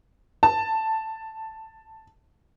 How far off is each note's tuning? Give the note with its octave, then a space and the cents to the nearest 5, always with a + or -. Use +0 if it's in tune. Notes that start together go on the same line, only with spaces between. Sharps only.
A5 +5